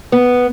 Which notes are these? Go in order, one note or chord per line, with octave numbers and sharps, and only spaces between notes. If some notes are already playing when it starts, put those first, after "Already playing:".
B3